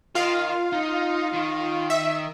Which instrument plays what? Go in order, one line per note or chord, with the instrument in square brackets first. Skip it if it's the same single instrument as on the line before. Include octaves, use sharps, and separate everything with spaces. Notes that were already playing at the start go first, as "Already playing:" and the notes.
[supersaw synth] F4 F5 [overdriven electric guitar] A#4 D#5
[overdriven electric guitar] D#4
D#3
[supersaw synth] E5